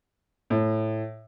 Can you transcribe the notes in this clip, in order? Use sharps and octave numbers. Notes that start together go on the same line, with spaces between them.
A2